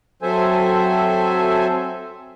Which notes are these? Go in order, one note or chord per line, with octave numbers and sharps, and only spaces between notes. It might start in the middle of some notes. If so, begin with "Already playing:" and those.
F#3 C4 A4 C5 E5 G#5